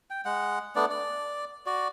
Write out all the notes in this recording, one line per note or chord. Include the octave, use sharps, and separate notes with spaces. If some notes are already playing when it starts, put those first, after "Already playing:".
G5
G#3 F#5
A3 B3 D4 D5
D5
F#4 D5